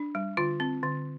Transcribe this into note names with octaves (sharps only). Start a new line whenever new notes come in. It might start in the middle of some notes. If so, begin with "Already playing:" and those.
Already playing: D4
G3
D3 F4
C4
D3